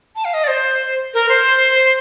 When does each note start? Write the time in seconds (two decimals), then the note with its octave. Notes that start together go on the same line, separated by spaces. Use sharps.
0.16 A5
0.25 F5
0.34 D#5
0.44 D5
0.48 C5
1.14 A#4
1.29 C5